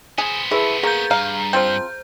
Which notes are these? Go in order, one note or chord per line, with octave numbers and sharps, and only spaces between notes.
B3 G#4 C5
E4 G#4 A4 B4
A#3 G#4 G6
G2 F5 A#5
F3 C4 C5 G6